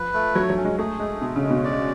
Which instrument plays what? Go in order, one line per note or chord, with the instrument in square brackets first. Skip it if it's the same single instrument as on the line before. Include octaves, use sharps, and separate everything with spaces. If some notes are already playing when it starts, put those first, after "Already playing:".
Already playing: [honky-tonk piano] F3 [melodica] B4
[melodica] A3
[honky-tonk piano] F#3 [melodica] C#5
[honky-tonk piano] F#3
[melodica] C#4
[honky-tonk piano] G#3
[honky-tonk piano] A3 [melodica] G#4
[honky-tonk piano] G#3 [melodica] A3
[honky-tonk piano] B2 [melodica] G#3
[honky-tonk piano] C#3
[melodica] G#3
[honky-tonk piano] B2
[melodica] D5